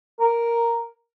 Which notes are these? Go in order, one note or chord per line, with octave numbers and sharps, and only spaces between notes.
A#4